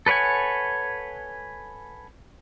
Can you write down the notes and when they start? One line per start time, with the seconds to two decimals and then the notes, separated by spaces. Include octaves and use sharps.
0.06 A4 B4 C#5 F#5 G#5